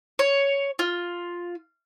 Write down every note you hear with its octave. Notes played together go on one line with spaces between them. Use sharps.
C#5
F4